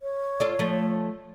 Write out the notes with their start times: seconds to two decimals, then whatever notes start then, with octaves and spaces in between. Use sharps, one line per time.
0.01 C#5
0.40 F4 A4 D5
0.59 F3 A3